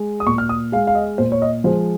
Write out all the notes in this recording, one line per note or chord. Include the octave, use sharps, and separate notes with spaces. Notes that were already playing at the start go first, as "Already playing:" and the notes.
Already playing: G#3
D#6
A#2 C#6
F6
D#6
G#3 F5
F5
D#5
A#2 C5
C#5
D#5
F3 G#3 C5